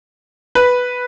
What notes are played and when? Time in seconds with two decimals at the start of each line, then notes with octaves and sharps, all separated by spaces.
0.55 B4